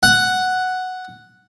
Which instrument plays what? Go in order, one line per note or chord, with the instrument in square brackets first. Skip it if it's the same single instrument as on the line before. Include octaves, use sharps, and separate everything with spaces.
[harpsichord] F#5